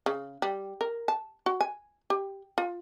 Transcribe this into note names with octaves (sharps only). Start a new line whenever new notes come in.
C#3
G3
A#4
A5
F#4
G#5
G4
F4